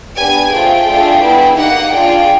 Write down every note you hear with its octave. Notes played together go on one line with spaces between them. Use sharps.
B3 D4 G4 G#5
A3 C4 F4 G#4 G5
A3 D4 F4 G#4
B3 E4 G#4
A#3 D#4 G4 F#5
D4 F4 G#4 G5